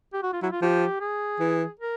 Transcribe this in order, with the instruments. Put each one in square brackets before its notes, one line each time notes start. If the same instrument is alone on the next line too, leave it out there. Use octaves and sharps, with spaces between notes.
[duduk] G4
F#4
F4
[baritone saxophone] F#3 [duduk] E4
[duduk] F4
[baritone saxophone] F3 [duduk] G4
[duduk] G#4
[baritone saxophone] E3
[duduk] A#4